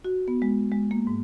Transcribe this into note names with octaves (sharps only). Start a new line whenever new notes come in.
F#4
B3
G#3
G#3
A#3
G#2